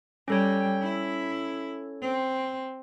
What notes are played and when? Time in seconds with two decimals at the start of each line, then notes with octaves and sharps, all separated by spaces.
0.28 G3 C#4 A4 C#5 G5
0.83 E4
2.02 C4